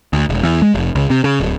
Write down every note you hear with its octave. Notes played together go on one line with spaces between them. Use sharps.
D2
E1
E2
G#3
F1
C#2
C3
C#3
D1